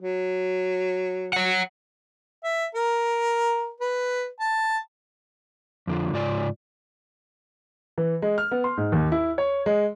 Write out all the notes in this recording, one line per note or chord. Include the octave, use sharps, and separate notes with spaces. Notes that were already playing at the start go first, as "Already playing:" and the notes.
F#3
C#5 F#5
E5
A#4
B4
A5
F2 D3 F4
G#2 C#3 F4 D5 G#5
E3
G#3
F6
B3
C6
G#2
D#2
E4
C#5
G#3